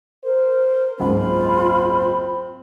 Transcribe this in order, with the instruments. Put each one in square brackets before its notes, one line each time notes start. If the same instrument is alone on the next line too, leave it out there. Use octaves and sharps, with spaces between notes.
[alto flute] A#4 [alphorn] C5
[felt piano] F#1 C#2 G#2 [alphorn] C4 [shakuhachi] F4 [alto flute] B5